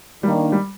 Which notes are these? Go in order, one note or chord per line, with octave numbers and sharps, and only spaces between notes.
D#3 G3 A#3 D4
G3